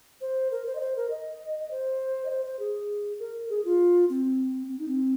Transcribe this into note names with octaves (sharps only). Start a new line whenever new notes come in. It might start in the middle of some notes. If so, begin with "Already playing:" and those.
C5
A#4
C5
D#5
C5
A#4
D#5
D#5
C5
D#5
C5
C5
G#4
A#4
G#4
F4
C4
C4
D#4
C4